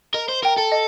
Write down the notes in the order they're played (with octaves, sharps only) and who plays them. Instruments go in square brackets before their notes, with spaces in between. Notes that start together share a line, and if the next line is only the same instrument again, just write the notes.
[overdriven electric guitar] A#4 [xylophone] D#5
[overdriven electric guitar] C5
[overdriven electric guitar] A#4 [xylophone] G5 A#5
[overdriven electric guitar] A4
[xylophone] D#5